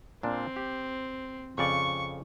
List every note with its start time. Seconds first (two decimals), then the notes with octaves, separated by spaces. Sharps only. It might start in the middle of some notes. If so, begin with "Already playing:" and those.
0.23 A#2 C4 D4
0.56 G4
1.58 F2 C#3 D5 C#6